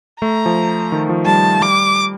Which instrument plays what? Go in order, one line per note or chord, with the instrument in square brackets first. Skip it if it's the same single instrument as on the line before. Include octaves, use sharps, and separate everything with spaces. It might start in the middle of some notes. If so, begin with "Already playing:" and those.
[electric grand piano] A3 [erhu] A#5
[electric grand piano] F3
D#3
F3
[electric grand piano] G3 [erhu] A5
[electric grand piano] G3 [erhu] D6